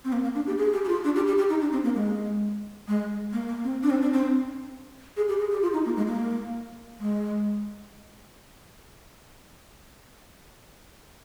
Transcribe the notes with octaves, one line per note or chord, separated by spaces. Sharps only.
C4
A#3
A#3
D4
G4
G#4
G4
G4
F4
D4
G4
G4
G4
D#4
D4
C4
A#3
G#3
G#3
A#3
A#3
C4
D4
C4
D4
C4
G#4
G4
G#4
G4
F4
D#4
A#3
G#3
A#3
G#3